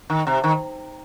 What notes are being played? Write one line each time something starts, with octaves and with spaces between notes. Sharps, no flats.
D#3
C3
D#3